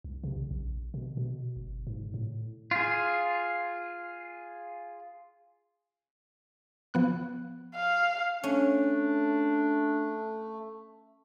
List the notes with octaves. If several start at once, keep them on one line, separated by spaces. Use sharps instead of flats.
C2
C3
B1
A#1
B2
B2
G1
G#2
A2
F4 G#4
F3 B3 F#6
F5
A3 C#4 D4